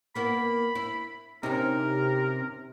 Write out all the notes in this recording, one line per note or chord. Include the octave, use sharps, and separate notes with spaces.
A#3 B3 E4 B5
E4
C3 C#4 D#4 A#4